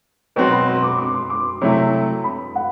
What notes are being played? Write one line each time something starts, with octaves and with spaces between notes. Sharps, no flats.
B2 F#3 C4 F#4 G5
B5
C6
D6
D6
C6
D6
C3 F#3 A3 E4
B5
F#5